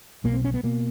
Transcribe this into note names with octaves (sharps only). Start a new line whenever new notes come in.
B1 B2 A#3
C4
C#4
B3
B2 A#3